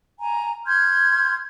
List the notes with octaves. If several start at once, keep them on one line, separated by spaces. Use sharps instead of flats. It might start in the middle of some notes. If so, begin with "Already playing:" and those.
G#5 A#5
C6 F6 G6 G#6